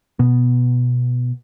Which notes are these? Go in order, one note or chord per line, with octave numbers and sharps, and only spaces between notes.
B2 B3